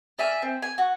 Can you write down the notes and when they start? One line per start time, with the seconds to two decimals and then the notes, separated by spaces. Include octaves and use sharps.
0.19 D5 E5 G#5 F6
0.42 C4
0.62 G#5
0.78 F#4